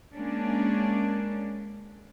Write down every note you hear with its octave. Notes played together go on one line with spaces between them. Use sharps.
G#3 A#3 C#4 D4